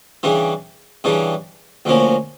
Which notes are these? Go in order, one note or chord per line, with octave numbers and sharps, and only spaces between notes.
C#3 E3 G3 D4
C#3 E3 G3 D4
D2 D3 F3 A#3 C#4